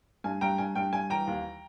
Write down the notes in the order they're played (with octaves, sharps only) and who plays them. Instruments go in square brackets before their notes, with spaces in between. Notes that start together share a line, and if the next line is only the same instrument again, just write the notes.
[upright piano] G2 G#5
G2 G5 A#5
G2 G#5
G2 G5
G2 G#5
E3 G5 A#5
D#2